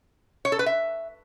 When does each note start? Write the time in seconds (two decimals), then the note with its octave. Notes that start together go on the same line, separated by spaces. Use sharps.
0.45 C#5
0.52 A4
0.59 B4
0.66 E5